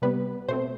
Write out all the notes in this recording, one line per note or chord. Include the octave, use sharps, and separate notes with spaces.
C3 G3 B3 B4
B2 A3 C4 C5